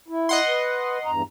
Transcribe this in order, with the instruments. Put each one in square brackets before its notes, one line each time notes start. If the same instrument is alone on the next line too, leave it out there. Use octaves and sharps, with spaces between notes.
[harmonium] E4
[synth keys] D#5 F#5 C6
[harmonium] B4
E2 G2 A#5